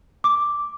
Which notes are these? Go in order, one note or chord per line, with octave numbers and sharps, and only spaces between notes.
D6